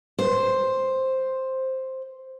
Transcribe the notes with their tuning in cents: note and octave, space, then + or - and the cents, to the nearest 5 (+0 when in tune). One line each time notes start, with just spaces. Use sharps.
C5 +5